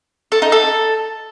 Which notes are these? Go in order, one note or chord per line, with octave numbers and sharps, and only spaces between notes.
A4
D#4
A4